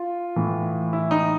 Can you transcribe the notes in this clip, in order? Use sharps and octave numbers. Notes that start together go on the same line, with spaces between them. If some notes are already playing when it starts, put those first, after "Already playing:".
Already playing: F4
A2 E3
E4
D#4